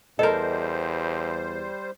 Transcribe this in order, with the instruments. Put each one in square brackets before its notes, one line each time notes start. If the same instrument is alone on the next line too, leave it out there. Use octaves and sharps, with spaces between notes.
[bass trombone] E2 [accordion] G3 C5 [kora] A4 A#4 [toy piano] D#5